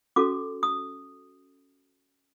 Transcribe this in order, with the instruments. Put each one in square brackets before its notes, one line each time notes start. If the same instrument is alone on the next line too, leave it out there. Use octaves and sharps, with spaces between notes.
[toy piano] C#4 F#4 A4 D6
D#6